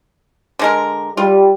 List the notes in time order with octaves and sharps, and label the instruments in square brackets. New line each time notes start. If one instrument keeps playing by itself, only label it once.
[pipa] D3 G#3 A#4
[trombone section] G3 [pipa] F4